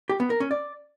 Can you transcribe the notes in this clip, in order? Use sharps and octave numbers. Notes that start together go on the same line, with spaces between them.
G4
B3
A#4
C#4
D5